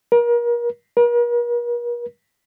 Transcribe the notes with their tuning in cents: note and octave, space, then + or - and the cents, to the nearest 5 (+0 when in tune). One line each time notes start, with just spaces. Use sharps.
A#4 +35
A#4 +45